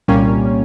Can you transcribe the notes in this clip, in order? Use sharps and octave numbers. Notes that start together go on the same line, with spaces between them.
C2 A#2 G3 A#3 C#4